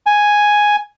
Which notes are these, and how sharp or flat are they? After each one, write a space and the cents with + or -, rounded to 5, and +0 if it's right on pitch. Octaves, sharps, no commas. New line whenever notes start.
G#5 +0